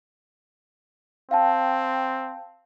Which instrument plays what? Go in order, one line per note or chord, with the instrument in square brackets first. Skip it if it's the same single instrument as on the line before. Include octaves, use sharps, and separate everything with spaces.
[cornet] C4 [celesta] F5 G5 A5